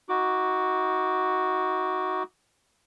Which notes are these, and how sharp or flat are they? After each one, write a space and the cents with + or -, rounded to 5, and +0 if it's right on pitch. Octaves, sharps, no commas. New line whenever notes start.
D#4 +30 F#4 +0 D6 +0